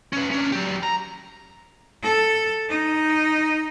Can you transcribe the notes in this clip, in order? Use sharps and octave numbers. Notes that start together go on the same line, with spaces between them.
C#4 B4
C#4 D4
F#3 G4
A#5
A4
D#4